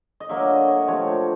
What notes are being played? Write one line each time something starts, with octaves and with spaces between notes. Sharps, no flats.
D#5
D3 F#3 A#3 E5
D#5
C#5
C3 F3 A3 D4 C#5
C5